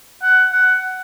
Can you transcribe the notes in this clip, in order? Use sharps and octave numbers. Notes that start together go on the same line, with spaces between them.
F#5
F#5